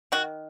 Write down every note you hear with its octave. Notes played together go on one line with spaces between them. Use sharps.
D#3 F#4